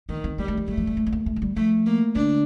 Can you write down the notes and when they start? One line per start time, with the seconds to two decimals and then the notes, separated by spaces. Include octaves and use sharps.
0.09 D#3 A#3
0.24 C4
0.38 G3 A#3
0.48 A3
0.57 F3
0.68 G3 A3
0.77 F3
0.87 G3
0.97 A3
1.07 C4
1.12 A#3
1.26 A3
1.36 A3
1.42 G3
1.56 F3 A3
1.86 A#3
2.15 D3 D4